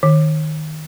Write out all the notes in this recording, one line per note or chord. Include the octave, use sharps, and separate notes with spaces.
D#3